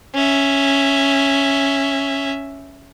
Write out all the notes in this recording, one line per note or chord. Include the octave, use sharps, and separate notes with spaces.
C#4 E5